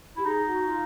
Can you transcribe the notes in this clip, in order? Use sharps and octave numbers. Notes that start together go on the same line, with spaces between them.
E4 G4
D#4 G#4
F#4
F4